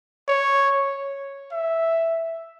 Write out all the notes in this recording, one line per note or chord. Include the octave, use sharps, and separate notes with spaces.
C#5
E5